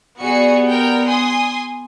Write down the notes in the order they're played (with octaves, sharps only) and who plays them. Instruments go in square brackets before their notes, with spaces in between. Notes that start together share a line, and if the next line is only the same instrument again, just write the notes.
[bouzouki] G3 [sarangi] B3 [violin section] F#4 G#4 C#7
[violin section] A#4 G5
G#5 C6 D#6